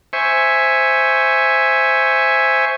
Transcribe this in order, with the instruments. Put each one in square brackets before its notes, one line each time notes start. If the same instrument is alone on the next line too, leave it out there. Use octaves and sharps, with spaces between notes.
[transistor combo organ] C5 E5 G#5 C#6